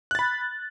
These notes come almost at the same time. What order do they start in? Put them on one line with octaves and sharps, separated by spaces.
F#6 A6 B5